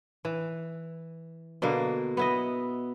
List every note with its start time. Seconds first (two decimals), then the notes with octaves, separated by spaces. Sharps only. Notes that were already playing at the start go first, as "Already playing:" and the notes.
0.25 E3
1.62 B2 D3 A#3
2.17 B3 E4 D#5